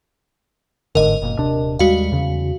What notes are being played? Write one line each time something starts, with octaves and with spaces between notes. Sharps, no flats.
G1 G#2 D3 A#4 D#5
F#1 A#2
D#1 C3 D4
D#2 G3 G#3 F#4 F5
E2 C#3